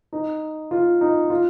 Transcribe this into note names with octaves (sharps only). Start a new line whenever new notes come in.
D#4
F4
D#4
F4